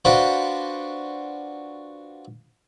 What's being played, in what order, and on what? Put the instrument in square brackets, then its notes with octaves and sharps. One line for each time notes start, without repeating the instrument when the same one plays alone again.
[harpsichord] D4 F4 F#4 B4 C5